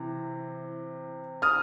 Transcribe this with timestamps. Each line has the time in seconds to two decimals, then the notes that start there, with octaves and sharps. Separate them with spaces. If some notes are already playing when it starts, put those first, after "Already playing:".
Already playing: C3 E3
1.42 D#6 F6